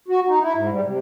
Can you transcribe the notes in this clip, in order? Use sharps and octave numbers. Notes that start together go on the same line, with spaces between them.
F#4
D#4
E4
G#2
G3
C3